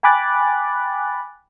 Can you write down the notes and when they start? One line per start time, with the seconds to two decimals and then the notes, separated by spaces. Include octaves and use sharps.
0.03 G5 G#5 B5 D6 F#6 A6